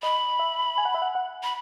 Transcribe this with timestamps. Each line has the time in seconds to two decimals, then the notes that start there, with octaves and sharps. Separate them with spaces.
0.03 D#5 B5
0.39 E5
0.78 G#5
0.85 F#5
0.94 E5
1.02 F#5
1.15 F#5
1.43 B5